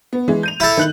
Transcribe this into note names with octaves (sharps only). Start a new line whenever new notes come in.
B3
E3 G#3
G6 D#7 F7
E4 A4
D#3 F#6 F#7